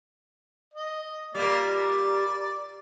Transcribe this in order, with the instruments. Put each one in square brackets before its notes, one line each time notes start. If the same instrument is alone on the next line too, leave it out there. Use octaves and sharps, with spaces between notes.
[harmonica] D#5
[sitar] A#2 G3 [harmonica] A#3 D5
[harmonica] D5